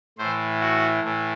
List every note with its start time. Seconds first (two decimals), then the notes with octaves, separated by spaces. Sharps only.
0.18 A2 E3 C5
0.61 F#4
1.04 A2 E3